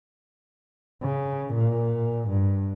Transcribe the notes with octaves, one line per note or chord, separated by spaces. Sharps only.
C#3
A#2
G2